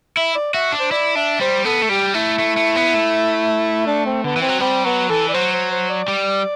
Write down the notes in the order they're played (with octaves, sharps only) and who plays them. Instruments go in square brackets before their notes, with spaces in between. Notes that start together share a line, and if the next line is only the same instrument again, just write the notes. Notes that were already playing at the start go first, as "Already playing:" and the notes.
[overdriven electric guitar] E4 [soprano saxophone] E5
[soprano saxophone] D5
[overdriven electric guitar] F#4 [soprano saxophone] E5
[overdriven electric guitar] D4
[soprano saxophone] C5
[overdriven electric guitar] E4 [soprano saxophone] D5
[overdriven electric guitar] D4 [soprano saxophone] E5
[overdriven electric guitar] G3 [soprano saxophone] C5
[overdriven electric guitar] B3 [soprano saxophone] A4
[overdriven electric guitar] A3
[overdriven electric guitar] G3 [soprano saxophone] G4
[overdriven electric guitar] A3 [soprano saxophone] E4
[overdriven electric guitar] A3
A3
B3
A3
[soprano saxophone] D4
C4
[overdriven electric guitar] D3 [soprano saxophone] B3
[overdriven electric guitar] E3
[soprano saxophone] C4
[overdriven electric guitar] F#3
[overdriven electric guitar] G3 [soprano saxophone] C4
[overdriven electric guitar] F#3 [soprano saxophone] B3
[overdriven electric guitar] E3 [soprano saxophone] A4
[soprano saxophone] D5
[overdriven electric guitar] F#3 [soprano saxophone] C5
[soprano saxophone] C5
C5
D5
[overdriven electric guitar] G3